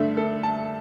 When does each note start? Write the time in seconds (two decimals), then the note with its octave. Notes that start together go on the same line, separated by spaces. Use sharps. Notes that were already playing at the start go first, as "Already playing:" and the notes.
Already playing: G2 D3 A3 E5
0.17 A4
0.43 A5